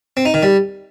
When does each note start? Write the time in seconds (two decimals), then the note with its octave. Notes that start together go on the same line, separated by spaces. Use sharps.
0.17 C4
0.25 D#4
0.34 D#3
0.43 G3